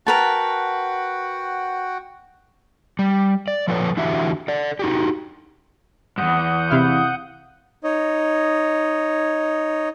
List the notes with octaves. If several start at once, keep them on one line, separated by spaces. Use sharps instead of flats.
F#4 A#4 B4 F#5 G5 A5
G3
D5
F3 A4 B4 C#5
D3 E3 E4 F#4 G4 E5
A4 D5
D#4 F#4 G4
E2 G2 F#5 D#6 G6
C3 E4 F5
D#4 C#5 D#5